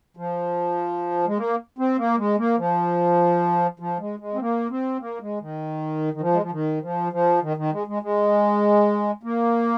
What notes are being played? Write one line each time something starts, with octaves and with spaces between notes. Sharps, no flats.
F3
G#3
A#3
C4
A#3
G#3
A#3
F3
F3
G#3
G#3
C4
A#3
C4
A#3
G#3
D#3
D#3
F3
G#3
F3
D#3
F3
F3
D#3
D#3
G#3
G#3
G#3
A#3